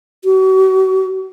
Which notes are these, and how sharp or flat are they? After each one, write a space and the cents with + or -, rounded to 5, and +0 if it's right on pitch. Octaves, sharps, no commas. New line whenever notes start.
F#4 +40